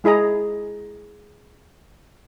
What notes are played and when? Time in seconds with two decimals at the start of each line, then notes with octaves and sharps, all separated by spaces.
0.04 G#3 E4 G#4 D#5 A#5